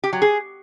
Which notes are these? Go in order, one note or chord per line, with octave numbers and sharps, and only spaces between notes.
G4
F#3
G#4